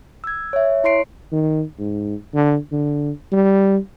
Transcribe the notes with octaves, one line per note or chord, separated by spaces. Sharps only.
E6 G#6
C#5 E5
E4 C#5 C6 C7 D7
D#3
G#2
D3
D3
G3